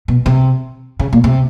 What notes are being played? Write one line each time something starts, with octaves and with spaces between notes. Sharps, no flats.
B2
C3
C#3
A#2
C3